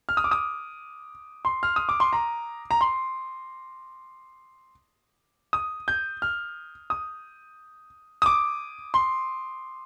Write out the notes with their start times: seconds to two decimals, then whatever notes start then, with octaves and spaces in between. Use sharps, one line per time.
0.09 F6
0.17 D#6
0.24 D6
0.31 D#6
1.45 C6
1.63 F6
1.76 D#6
1.89 D6
2.00 C6
2.13 A#5
2.71 A#5
2.81 C6
5.53 D#6
5.88 G6
6.22 F6
6.90 D#6
8.22 D#6
8.26 D6
8.94 C6